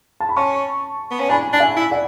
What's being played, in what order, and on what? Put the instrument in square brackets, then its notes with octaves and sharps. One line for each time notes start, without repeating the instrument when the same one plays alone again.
[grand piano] A5
B5
[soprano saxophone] C#4 [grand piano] A5 C#6
[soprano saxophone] B3
C#4
[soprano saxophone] D4 [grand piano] G#5 B5
[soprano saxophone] D4
[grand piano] E5 G#5
[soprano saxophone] E4
[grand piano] D5 F#5